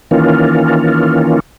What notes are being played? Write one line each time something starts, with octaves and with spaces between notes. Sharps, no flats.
D#3 E3 A#3 C#4 F4